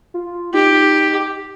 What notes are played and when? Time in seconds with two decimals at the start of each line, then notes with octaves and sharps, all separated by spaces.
0.14 F4
0.54 D#4 G4